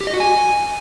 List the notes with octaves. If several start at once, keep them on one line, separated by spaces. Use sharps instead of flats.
G4
D#5
F#4
G#5